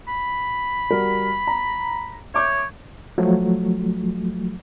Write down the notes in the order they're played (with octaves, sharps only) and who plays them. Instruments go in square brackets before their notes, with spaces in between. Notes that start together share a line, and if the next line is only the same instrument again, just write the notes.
[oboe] B5
[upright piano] G3 F#4 A#4
A#5
[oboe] C#5 [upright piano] E5 D6 G6
[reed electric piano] F3 F#3 A3